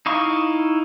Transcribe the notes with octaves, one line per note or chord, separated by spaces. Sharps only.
D#4 E4 F5 C#6